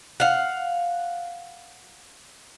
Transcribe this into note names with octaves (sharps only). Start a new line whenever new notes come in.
F5 F#5